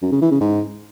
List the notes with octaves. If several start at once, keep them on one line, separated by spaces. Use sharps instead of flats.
F#2
C#3
E3
C#3
G#2